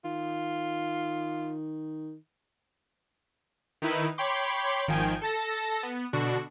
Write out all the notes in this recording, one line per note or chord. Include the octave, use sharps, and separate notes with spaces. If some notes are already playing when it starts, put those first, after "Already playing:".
D#3 F4
D#3 D#4 E4 B4
C#5 G5 B5 C6 D6
G#1 D#3 F3 G5 G#5
A4 A5 A#6
B3
B2 D3 D4 F#4